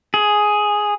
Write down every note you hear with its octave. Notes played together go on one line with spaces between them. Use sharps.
G#4